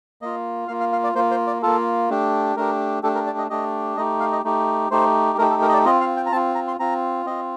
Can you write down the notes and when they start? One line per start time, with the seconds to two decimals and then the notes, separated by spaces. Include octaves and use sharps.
0.22 A#3 F4 D#5
0.68 A#3 F4 F5
0.80 F5
0.92 F5
1.04 D5
1.15 A#3 C5
1.18 F4
1.31 C5
1.47 D5
1.62 A#3 F4 A4
2.09 A3 D4 G4
2.56 A3 D4 G4 A#4
3.03 A3 D4 G4 A4
3.15 A#4
3.27 D5
3.38 D#5
3.50 A3 D4 G4 D#5
3.97 A3 D#4 G4 D#5
4.20 F5
4.32 D#5
4.44 A3 D#4 G4
4.91 A3 D#4 G4 C5
5.38 A3 D#4 G4 A#4
5.50 A4
5.62 A#4
5.69 D#5
5.73 D5
5.85 C4 F4 D#5
6.01 F5
6.17 G5
6.26 A#5
6.32 C4 A5
6.36 F4
6.55 A#5
6.67 C6
6.79 C4 F4 A#5
7.26 C4 F4 D#5